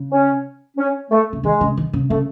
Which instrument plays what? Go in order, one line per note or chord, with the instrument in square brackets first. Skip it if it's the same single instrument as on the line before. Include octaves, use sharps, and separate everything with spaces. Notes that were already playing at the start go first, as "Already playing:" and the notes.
Already playing: [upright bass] C#3
[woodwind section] C#4
C#4
A3
[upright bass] C#3
[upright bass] D#3 [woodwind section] G#3
[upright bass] C#3
D#3
C#3
[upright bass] C#3 [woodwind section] A3